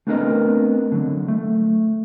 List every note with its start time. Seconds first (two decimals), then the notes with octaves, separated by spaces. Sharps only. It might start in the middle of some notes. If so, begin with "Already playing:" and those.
0.07 A3 B3 C4 D4 A#4 D#5
0.92 D3 F#3
1.28 A3